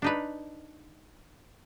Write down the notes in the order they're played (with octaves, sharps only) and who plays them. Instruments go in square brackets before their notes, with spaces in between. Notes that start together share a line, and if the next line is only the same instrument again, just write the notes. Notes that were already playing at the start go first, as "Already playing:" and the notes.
[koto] D4 D#4 B4